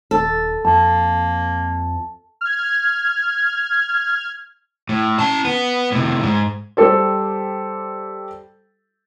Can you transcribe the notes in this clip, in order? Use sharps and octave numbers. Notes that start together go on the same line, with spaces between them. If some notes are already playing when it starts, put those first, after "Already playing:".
D#1 A4
F2 A#3 A5
F6 G#6
A2
C#4 A5
B3
A2 C3
G#2
G3 G4 A4 C5